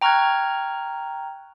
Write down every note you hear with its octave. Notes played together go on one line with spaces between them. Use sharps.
G5 A#5 C#6 F6 F#6 G#6